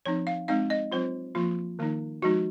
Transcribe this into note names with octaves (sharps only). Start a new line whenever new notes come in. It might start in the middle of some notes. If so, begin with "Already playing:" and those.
F3 C4 D#4 C#5
F5
G#3 C4 D#4 F5
D#5
F#3 C4 F4 C5
F3 A#3 F4
D#3 A#3 D#4
F3 G#3 D#4 F#4